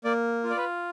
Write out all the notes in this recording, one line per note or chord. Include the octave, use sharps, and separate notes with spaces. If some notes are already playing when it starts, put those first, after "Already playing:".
A#3 D5
F4
D5
B4